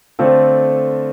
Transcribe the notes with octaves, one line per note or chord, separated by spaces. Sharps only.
D3 A3 C4 F4 A4